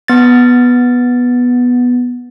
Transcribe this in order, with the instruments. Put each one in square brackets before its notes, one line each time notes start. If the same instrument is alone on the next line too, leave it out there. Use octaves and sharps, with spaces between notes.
[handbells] B3 A6